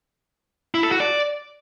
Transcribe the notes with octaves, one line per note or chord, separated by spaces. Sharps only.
E4
A4
F#4
D5